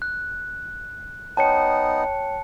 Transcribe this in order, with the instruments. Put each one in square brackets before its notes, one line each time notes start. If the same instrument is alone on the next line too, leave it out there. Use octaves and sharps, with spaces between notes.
[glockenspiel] F#6
[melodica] B3 D#4 [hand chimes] C#5 G5 [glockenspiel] A5 C#7